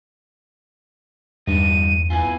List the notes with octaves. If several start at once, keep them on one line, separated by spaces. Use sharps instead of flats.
E2 G2 D3 G3 D#4 D#7
B3 E4 F4 G#5